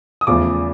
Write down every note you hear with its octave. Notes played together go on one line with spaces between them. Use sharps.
D#6
E2 C#3 F3 A3 D6